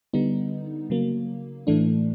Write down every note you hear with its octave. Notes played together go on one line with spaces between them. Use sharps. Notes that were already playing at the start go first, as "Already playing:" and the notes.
D3 G3 B3 D#4
C#3 F#3 A#3
A2 E3 A3 D4